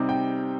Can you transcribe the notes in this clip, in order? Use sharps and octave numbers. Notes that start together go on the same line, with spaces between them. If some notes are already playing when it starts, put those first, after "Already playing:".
Already playing: C3 G3 C4 D#4
G5